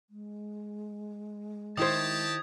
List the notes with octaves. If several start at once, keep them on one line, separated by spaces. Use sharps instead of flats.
G#3
D#3 E4 G4 C5 A5 D#6 G#6